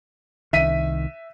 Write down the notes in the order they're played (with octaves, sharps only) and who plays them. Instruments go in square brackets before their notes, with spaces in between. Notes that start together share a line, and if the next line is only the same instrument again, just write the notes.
[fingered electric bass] C2 D#3 [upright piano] E5 B6 D#7